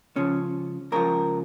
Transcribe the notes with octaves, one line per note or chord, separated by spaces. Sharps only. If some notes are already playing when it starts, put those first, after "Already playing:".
C#2 C#3 F3 C#4
C#2 C#3 F3 A#4